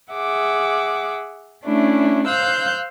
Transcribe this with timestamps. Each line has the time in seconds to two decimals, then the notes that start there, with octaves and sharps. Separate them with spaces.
0.12 G#4 E5 F#5 D6
1.65 A3 C#4 D4 E4
2.28 C5 F5 E6 F#6 G6